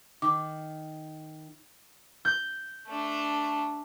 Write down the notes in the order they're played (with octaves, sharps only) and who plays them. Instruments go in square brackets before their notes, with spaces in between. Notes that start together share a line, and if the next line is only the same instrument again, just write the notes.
[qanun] D#3 [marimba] D6
[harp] G6
[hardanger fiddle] A3 D4